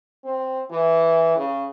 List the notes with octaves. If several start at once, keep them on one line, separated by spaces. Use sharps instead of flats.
C4
E3
C#3